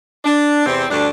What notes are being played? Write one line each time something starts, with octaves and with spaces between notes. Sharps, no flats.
D4
E2 C3 C4
D2 G2 D4